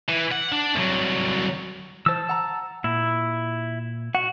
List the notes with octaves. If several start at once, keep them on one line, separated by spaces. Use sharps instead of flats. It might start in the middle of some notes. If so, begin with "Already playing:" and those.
E3
F#5
D4
C2 F#3
E3 C5 A5 E6
F#5 A#5
A#2 E4
F#4 F#5